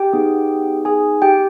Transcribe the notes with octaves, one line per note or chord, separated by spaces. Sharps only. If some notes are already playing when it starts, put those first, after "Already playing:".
Already playing: G4 G5
B3 D#4 G#4
G#4 G#5
G4 G5